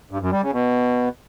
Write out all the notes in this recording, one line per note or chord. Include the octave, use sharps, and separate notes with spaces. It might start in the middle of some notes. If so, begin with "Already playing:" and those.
G2
F#2
G3
C#3
B2